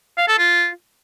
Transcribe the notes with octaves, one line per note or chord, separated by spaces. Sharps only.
F5
A4
F4